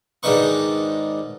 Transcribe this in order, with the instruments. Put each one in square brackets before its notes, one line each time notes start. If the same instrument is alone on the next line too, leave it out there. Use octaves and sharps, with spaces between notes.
[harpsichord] G#2 D#3 D4 D#4 B4 C#6